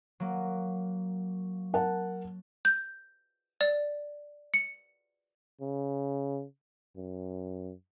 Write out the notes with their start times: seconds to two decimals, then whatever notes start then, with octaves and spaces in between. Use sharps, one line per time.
0.20 F#3 A#3
1.74 A#4 F#5 A5
2.65 G6
3.61 D5
4.54 C#7
5.61 C#3
6.97 F#2